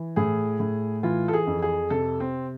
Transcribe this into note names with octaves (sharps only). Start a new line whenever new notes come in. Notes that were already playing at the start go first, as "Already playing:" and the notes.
Already playing: E3
A2 G#4
A2
E3 F4
A4
G#4
F2
G#4
C3 A4
C4